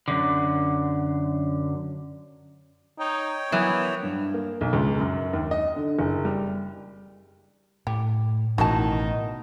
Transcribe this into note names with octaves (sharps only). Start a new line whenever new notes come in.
F#2 D3
D#4 C#5 G5
E3 F#3 B3 A#4 D6
G2
A#3
B1
C#2
F#2
D#2
D#5
D3
F#1
G3
A2 G4
A1 B2 D#3 F#3 D#4 E4 F#4 A5